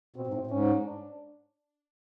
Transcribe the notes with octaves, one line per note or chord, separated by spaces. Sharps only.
B2 C4
G#2
A2
A2
G#2 C#4
D4